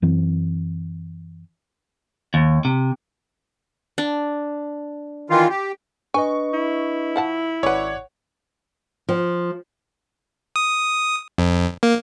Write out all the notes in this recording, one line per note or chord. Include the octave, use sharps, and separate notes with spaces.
F#2 E3 C4
D#2
C3
D4
D#3 E3 F4
G4
D4 B4 D#5 G#5 C#6
E4
F3 F#5 A5
G#1 C#4 B4 C#5 D5 F#5 D6
F3
D#6
F2
A#3